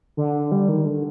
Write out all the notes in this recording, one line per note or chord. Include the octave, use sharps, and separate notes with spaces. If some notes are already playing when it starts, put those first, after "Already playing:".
D3
G3
D#3
D3